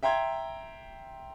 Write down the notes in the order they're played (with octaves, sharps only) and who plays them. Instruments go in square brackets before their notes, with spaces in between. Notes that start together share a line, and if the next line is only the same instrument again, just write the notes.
[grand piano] E5 G5 A#5 C6 G#6